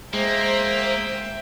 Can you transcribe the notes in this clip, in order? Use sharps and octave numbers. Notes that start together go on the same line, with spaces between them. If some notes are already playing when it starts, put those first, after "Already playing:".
G#3 A#3 C5 E5 G5